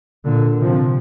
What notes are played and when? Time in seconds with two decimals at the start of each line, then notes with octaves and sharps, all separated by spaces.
0.25 A#2 D3
0.60 C3 F3